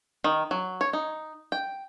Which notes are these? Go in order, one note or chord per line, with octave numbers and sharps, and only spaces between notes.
D#3
F#3
C#5
D#4
G5